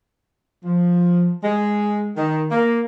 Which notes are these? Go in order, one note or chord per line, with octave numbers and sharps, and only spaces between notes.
F3
G#3
D#3
A#3